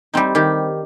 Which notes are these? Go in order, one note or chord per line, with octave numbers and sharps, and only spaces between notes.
G3 C4 D#4
D#3 G4